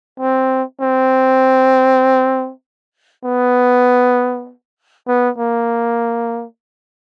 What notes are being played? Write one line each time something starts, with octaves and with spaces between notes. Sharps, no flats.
C4
C4
B3
B3
A#3